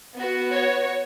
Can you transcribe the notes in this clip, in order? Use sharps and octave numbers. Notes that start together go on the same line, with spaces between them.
B3 F#4
C#5